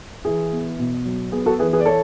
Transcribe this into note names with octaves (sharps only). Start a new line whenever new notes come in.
E3 G#4
B3
B2
F#3
B3 G#4
F#4 A4
E3 G#4 B4
G#4 B4
D5
A4 C#5